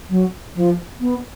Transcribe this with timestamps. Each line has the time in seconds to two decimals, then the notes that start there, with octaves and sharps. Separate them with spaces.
0.09 F#3
0.55 F3
1.00 B3